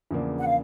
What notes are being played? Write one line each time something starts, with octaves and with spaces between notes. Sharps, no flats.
E2 C#3 F3 A#3 D4
F#5
F5